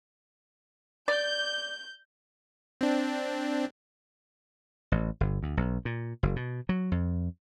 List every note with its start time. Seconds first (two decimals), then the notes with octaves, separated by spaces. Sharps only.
1.08 D5 G6
2.81 C4 D4
4.92 A1
5.21 G1
5.43 D2
5.57 B1
5.85 A#2
6.23 F#1
6.36 B2
6.69 F#3
6.92 F2